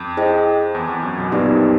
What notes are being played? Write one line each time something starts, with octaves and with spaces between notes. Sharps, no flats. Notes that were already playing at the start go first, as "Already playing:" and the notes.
Already playing: F2
E4 G#4 C5 D#5 G5
E2
E2
F#2
B1 B2
A#1 A#2 B3 D#4 G4 B4 D5
F#2
F2